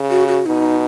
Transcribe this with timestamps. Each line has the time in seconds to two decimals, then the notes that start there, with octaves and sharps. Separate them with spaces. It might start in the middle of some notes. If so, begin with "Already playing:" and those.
Already playing: C#3
0.10 F#4
0.28 F#4
0.46 B2 D#4